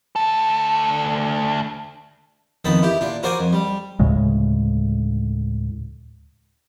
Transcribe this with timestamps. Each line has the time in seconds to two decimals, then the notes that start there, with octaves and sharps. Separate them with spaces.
0.16 D2 A4
2.65 F2 D#3 B3 A5 B5
2.82 E4 G4
3.01 A#2 D4
3.23 F#4 A#4 C5 D5 G#5
3.40 F2
3.53 G3
3.99 D2 A2 C#3 G#3